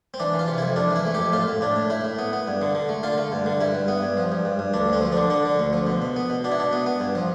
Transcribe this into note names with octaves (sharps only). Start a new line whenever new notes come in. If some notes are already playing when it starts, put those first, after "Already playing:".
C4
E3 D4
E3
F4
C3
F2 E4
F2 D4
E3
E4
A3
F2 G4
A2 F4
A2
A2 D4
A2
A2 E4
A2
B3
B3
G2
D3
D3
A3
D3 F4
A3
G2
D3
G2 E4
G2
B3
G2
F3
G2
G2
G2
D2 D4
D2 C4
F3
D3 D4
D3 D4
D3
D2
F3
B2
B2
B3
B2
B2 D4
E4
B2 D4
B3
B3
G2
F3